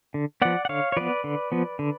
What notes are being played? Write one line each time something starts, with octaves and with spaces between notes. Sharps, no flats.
D3
F3 B3 D5 F#5
F#5
D3 C#5 F5
C#5
F3 B3 B4 D5
D3
F3 B3
D3